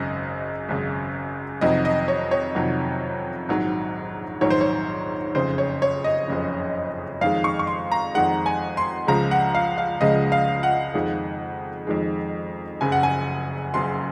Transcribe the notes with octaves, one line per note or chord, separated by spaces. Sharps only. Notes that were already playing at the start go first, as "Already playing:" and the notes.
Already playing: G#1 F#2 C#3 D#5
G#1 F#2 C#3
F2 C3 D#3 F#3 D#5
D#5
C#5
C#5
F2 C3 D#3 F#3
A#1 G#2 D#3 F#3
A#1 G#2 D#3 F#3 C#5
C5
C#5
F#1 F2 C#3 C5
C#5
C#5
D#5
F#1 F2 C#3
F2 D#3 G#3 F5
C#6
C#6
C6
A#5
F2 D#3 G#3 F#5
G#5
C6
C#2 C#3 F3 G#3 A#5
F#5
F5
F5
C#2 C#3 F3 G#3 D#5
F5
F#5
F2 D#3 G#3
F2 D#3 G#3
F#1 F#2 C#3 G#5
F#5
G#5
F#1 F#2 C#3 C6